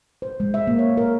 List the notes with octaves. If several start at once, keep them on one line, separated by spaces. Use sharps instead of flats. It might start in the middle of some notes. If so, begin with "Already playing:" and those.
C5
G#3
E5
A#3
C#5
A#4